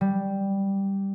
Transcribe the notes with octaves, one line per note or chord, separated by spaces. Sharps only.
G3